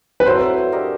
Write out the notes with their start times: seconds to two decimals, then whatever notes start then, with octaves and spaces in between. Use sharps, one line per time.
0.20 B4
0.26 F#3 A3 C4 E4 C5
0.72 D4 G4 A#4 D#5